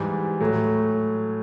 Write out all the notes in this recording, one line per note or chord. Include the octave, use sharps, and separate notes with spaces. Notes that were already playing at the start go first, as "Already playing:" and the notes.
Already playing: G#2 E3 G3
A2 F#3 A3